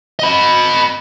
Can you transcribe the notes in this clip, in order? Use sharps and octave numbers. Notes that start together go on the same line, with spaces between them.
D#5 B5